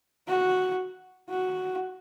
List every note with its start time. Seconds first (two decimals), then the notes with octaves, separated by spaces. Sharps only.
0.28 F#4
1.29 F#4